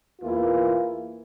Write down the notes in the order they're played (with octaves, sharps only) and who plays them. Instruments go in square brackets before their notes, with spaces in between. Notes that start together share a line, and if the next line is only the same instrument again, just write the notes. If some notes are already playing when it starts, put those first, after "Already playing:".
[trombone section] E2 E3 A#3 E4 [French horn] F4